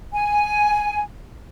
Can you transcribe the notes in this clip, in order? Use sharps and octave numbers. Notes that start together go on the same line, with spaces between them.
G#5